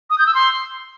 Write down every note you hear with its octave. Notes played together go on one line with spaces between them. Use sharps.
D#6
G6
E6
C6